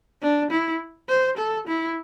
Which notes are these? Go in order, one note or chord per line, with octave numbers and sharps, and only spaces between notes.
D4
E4
C5
A4
E4